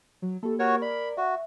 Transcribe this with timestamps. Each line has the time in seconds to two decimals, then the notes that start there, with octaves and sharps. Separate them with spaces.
0.22 F#3
0.43 A#3 G4 A4
0.59 F#4 A#4 C#5
0.82 D5 B5
1.17 F#4 E5